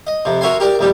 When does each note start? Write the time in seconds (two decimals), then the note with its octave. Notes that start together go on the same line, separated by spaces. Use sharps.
0.07 D#5
0.25 F2 C3
0.41 F#4 A#4 C#5 E5 G#5 C6
0.60 G4 A#4 D5
0.79 A#1 D#2 G3 B3 G4